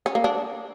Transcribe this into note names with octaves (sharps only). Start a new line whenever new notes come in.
C#4
A#3
D4